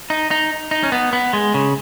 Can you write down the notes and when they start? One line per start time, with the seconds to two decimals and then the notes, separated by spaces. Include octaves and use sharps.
0.10 D#4
0.31 D#4
0.71 D#4
0.83 C#4
0.92 B3
1.13 B3
1.33 G#3
1.54 C#3